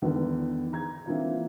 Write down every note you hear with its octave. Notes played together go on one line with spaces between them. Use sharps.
E2 D3 D#3 B3
A#5 G#6
E3 A#3 C4 D4 D#4 F4